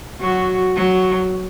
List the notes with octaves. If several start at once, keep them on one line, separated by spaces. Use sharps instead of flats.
F#3 F#4
F#3 F#4